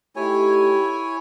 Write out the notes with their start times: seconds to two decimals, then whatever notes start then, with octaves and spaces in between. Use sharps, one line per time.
0.16 A3 D#4 E4 G4 C#5 G#5